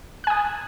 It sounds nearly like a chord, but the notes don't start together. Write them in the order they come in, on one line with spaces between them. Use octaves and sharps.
F#6 G#5 D#6